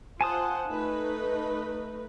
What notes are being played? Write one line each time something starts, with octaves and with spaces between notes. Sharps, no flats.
F4 C5 F#5 G#5 A5 D#6
A3 D#4 B4